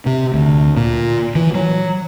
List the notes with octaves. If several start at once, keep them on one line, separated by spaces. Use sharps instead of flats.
C3
D2
A#2
E3
F#3